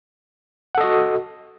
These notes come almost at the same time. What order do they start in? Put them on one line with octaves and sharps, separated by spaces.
F#5 A4 D#5 F#4